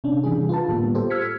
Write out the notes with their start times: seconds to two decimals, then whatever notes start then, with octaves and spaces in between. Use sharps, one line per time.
0.04 C3 C#4 D4
0.24 C3 E3 G3 D4 G#4
0.49 F4 B4 A5
0.69 A2 D3 G3 A#3 B3
0.95 F4 G4 A4 C5
1.10 E6 F6 G#6 B6 C#7